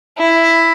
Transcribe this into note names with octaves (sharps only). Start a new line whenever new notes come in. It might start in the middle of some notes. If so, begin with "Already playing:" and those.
E4